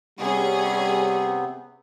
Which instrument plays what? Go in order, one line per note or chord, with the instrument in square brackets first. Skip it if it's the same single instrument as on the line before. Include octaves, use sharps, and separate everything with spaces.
[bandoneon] C3 B3 [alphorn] G3 [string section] C#4 G#4